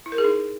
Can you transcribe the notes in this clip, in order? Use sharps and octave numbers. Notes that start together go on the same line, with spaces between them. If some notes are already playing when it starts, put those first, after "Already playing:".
E4
A#4
G#4
D#4